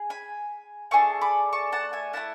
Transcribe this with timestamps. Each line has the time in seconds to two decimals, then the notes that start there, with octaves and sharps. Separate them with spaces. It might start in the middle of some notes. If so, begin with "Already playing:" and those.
Already playing: G#4
0.10 G#5 B5
0.91 A3 D4 G#4 A5 C#6
1.21 B5 D6
1.53 A5 C#6
1.72 F#5 A5
1.93 E5 G#5
2.13 A3 C#4 E4 F#5 A5